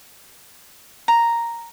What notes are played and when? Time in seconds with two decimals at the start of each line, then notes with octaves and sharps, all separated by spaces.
1.08 A#5